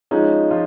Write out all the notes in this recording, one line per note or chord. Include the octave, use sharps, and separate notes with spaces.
F3 G#3 C#4 D#4
F3 F4